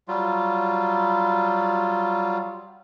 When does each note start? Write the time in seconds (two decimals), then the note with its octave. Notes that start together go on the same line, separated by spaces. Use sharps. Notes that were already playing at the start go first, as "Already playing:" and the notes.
0.08 F#3 G3 F4